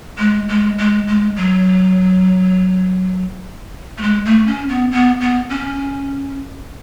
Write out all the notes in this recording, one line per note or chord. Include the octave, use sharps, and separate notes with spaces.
G#3
G#3
G#3
G#3
F#3
A3
G#3
A3
C#4
B3
B3
B3
C#4